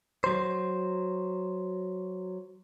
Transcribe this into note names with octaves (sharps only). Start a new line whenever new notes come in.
F#3 C5